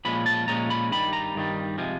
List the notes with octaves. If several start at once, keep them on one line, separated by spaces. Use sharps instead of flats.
A#2 F3 G#3 C#4 B5
A5
A#2 F3 G#3 C#4 A#5
B5
G2 D#3 G3 B5
A#5
G2 D#3 G3
C3 F3 G#3